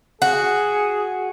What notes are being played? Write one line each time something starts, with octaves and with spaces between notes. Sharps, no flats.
F#4 G#4